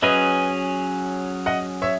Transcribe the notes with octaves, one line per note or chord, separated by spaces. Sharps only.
F#3 C#4 G#4 B4 D#5
D#5 F#5
C#5 E5